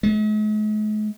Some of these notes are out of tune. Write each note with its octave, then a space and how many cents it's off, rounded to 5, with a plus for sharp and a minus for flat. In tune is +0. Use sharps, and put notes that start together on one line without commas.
G#3 +45